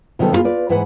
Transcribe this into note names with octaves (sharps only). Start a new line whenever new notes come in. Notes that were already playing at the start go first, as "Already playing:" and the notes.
C3 D#3 F#3 B3 A4
A#3 B3 C#4 F4 G#4
F4 B4 D5
G#2 E3 B4 F#5 G#5